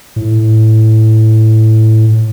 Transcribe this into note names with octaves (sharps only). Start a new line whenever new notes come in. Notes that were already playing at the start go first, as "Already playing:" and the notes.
A2